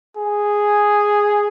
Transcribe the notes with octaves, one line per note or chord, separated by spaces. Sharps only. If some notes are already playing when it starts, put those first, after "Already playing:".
G#4